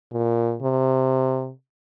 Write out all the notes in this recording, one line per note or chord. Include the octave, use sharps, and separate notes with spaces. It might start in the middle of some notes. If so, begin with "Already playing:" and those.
A#2
C3